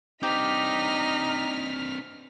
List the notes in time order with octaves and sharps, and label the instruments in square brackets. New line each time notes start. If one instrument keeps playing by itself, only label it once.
[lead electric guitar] C4 D4 [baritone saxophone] D#4 [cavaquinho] G4 [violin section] F6 B6